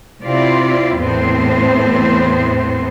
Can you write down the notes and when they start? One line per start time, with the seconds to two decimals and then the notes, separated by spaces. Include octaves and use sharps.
0.23 C3 C4 E4 F4 D5
0.95 E2 A2 B3 C4 C5